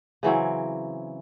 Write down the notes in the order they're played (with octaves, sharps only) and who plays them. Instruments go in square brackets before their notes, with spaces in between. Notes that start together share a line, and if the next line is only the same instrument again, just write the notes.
[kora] C#3 E3 F#3 C4